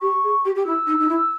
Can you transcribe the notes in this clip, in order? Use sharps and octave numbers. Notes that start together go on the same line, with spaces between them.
G4 C#6
G#4
G4
G4
E4 E6
D#4
D#4
E4